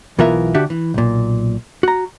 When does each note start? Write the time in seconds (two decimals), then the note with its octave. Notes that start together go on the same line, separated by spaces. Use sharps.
0.19 B1 E3 B3 F4 A#4 E5
0.54 D2 D3 D4 F#4 G4 E5
0.70 E3
0.94 B1 A#2
1.83 F#4 A#5